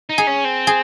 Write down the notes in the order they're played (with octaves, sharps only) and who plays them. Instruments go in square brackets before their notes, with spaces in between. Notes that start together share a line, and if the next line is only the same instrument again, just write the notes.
[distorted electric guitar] D#4
[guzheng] G#4
[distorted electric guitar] C#4
C4
[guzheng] G#4